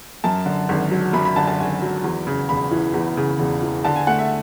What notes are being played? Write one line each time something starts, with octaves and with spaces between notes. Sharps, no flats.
F#2 A5
D3
G#1
F#3
F#2 B5
B5
D3 A5
A5
G#1 G#5
F#3
E2
C#3
E1 B5
E3
E2
C#3
E1
E3
D3 A5
G#5
A3 F#5
E5